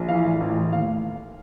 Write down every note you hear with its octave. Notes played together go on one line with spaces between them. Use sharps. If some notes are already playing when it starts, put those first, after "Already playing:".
Already playing: A#1
E3 F5
A2
A1
A2
D#2 F5